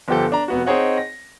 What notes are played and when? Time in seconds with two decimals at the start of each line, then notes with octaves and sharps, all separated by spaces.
0.08 G1 F3 G4 A4
0.32 D4 A#5
0.48 F1 B3 F#4
0.66 C4 D#4 G#4 C#5 D#5 F#5
0.98 A#6